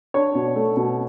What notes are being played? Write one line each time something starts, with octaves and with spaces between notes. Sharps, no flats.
D4 C#5
B2
A3
B2